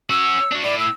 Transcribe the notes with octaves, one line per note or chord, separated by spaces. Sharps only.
C#4 F#4 E6
D4 F#4
A2 D5
E6